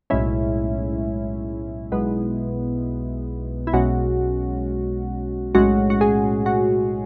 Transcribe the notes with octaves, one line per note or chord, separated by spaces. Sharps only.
B1 A2 G#3 C#4 E4
B1 B2 G#3 B3
E4
B1 B2 G#3 C#4 F#4
B1 A2 G#3 C#4 F#4
F#4
G#4
F#4